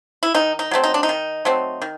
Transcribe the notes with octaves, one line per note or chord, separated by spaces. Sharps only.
E4
D#3 D#4
D#4
F#3 A3 C4
D#4
D4
D#4
D#3
F#3 A3 C4
D#3